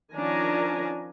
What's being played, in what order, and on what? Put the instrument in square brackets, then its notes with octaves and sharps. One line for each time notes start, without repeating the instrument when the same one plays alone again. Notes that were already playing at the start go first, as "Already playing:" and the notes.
[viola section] D#3 F3 C#4 D4 G#5 A#5